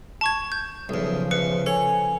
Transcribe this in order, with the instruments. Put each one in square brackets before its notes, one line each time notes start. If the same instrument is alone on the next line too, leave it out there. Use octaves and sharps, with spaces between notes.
[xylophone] A5 C#6 G#6
G6
[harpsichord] B1 E2 [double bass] C#3 F3 [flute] D#6
[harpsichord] E2 [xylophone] B4 C#7
[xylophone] A4 [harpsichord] C#5 [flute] G#5